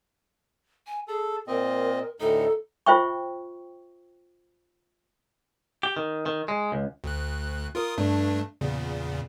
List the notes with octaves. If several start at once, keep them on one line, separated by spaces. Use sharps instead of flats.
G#5
G#4 A4
A#2 C4 A#4 D#5
D2 A2 D#4 A4
F4 C5 E5 G5 C#6
G4
D#3
D#3
G#3
C#2
D2 F#6
F4 A#4 D#6
G2 A3 D4
E2 A#2 C#3